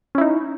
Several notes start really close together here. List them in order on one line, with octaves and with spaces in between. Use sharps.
C#4 E4 D#4